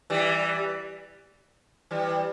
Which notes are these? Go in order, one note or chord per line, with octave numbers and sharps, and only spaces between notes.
E3 G3
E3 G3